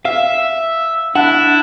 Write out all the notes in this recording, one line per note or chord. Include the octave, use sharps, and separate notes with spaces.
E5 F5
D4 E4 F#5